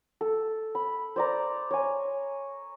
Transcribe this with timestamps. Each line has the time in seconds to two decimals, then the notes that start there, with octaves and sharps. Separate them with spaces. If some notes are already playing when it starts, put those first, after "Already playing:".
0.21 A4
0.75 B5
1.16 C5 D5 A#5
1.71 C#5 G#5